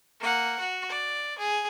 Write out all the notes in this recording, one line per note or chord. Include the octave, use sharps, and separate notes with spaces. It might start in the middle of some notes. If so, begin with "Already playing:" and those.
A#3 F#5
F#4
D5
G#4